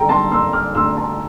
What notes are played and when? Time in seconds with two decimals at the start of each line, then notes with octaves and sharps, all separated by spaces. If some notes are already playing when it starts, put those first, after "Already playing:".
Already playing: D3 G3 A4 G5 A#5
0.09 A5 C6
0.32 A#3 C6 E6
0.53 D6 F6
0.75 D2 C6 E6
0.97 A5 C6